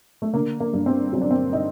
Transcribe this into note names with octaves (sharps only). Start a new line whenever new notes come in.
A3
D3 A#3
A#3
G2
C4
F#3 C4
D4
C4
D#4